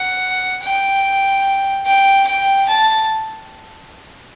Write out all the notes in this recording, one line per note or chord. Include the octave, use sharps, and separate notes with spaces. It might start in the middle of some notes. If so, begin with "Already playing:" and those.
Already playing: F#5
G5
G5
G5
A5